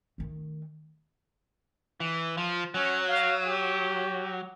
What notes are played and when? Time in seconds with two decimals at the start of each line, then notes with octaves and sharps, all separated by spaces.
0.18 D#3 A3
2.00 E3
2.37 F3
2.74 F#3 C#4
3.07 F5
3.46 G4